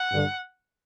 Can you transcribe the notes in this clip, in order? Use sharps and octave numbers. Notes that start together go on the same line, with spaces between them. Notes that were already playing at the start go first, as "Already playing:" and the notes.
Already playing: F#5
G2 D3